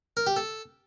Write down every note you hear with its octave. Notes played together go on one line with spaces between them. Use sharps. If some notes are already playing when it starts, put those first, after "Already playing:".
A#4
G4
A4